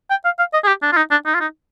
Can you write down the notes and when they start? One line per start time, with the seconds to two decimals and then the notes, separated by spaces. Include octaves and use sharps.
0.10 G5
0.25 F5
0.39 F5
0.53 D#5
0.64 G#4
0.68 G4
0.82 D4
0.92 F4
0.97 D#4
1.11 D4
1.26 D#4
1.34 F4
1.40 D#4